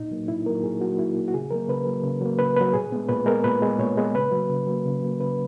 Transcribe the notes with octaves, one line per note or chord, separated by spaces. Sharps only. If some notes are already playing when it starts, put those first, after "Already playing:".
Already playing: A#2 D#4
F#3 A#3
A#2 E4
F#3 A#3 A#4
A#2 G#4
F#3 A#3 F#4
A#2 E4
F#3 A#3
F#4
C#3 G#4
F#3 A#3 A#4
C#3 B4
F#3 A#3
C#3
F#3 A#3
C#3 B4
F#3 A#3 B4
A#2 G#4
G#3 B3
A#2 B4
G#3 B3 A#4
A#2 B4
G#3 B3
A#2 C#5
G#3 B3
C#3 B4
F#3 A#3
C#3
F#3 A#3
C#3
F#3 A#3
C#3 B4